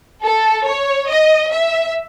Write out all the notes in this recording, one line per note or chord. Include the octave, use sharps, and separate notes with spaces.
A4
C#5
D#5
E5